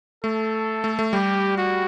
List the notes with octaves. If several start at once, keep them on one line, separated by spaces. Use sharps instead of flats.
A3 A4
A3
A3
G3 G4
F#4